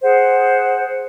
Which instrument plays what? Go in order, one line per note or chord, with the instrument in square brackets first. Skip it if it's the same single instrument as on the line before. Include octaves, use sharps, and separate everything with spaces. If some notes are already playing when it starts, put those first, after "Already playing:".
[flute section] G#4 C5 F#5